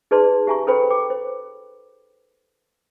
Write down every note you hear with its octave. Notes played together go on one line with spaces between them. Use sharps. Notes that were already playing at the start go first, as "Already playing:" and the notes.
D#4 G#4 B4 D5 A5 C6
G4 E5 G#5 A#5 C#6
A4 B4 C5 G5 B5
G5 D6
C5